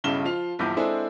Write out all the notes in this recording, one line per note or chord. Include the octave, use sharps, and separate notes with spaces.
B1 G2 C#3 E4 E7 G7
F3 F4 F5 F7
A#1 E2 G2 D6 G6
G#3 C4 D4 E4 G#4 A4